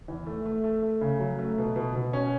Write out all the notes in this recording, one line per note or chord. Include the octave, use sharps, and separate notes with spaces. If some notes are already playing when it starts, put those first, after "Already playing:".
E2
A3
A3
A3
A3
C#3
F#3
A3
B2
B2
B2
C#4